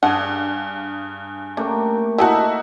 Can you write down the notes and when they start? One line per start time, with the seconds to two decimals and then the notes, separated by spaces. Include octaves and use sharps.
0.03 G2 G#4 F#5 G#5 A5 D6
1.57 A3 A#3 C#4 G4
2.18 D3 D#4 E4 F#4 G#5 A5